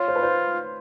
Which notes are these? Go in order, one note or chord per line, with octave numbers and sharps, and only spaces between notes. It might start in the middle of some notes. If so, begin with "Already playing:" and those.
Already playing: F4 C#5
C5
B4
C5